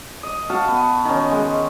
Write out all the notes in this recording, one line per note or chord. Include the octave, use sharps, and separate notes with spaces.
D#5
F#4 F5 F#5 A5
B3
D#3 C#4
G#3